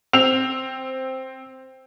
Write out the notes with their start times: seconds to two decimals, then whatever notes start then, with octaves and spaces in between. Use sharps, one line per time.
0.13 C4 E6 F7